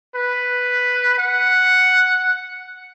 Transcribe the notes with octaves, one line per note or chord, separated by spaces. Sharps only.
B4
F#5